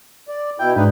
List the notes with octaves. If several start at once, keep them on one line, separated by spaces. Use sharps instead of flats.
D5
B2 E4 G5
G#2 D4 D#4 B4